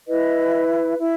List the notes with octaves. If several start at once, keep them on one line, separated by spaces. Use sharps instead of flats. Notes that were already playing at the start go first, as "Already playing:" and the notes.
E4 B4 D#5
E4